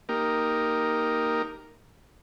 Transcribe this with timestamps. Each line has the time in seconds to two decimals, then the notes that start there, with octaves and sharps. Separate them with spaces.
0.09 A#3 D#4 G4 A#4